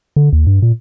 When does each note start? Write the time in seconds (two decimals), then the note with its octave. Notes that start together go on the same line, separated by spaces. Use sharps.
0.16 D3
0.33 D#2
0.47 G2
0.62 A#2